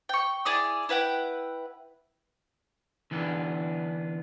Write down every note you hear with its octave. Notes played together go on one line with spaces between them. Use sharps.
G5 C#6
E4 G#4 D5 D#6
E4 B4 F#5 G5
D3 E3 B3 D4